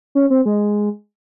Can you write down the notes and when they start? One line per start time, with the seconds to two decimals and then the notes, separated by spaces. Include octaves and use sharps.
0.15 C#4
0.30 C4
0.46 G#3